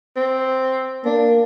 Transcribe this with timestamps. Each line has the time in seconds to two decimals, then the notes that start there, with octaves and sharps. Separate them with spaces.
0.16 C4
1.05 A#3 D4